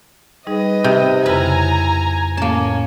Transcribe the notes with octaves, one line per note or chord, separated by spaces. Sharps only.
G3 D#4 G#4 B4 D#5
C3
F2 C#3 E4 B4 G#5 A#5
A2 A#3 C#4 A5